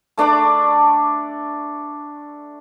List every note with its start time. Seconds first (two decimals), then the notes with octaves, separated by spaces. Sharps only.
0.17 A3 D4 D5 D6